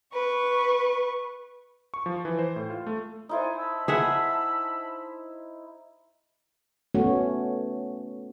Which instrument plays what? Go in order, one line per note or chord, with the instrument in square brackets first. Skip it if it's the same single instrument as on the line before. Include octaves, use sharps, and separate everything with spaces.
[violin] B4 C#6
[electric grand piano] C#6
F3
E3
C5
A2
F4
A3
[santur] D#4 E4 C5 [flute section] D5 F#5 G#5
[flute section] A5 B5 E6
[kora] G#4 E5 F#5
[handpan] A3 B3 C#4 F#4 C#5